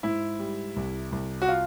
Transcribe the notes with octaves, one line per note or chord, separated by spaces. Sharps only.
G#2 E4
G3
C2
C2
F#4
F4